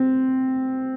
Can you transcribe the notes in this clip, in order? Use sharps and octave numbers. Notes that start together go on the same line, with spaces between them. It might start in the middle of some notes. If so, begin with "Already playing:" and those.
Already playing: C4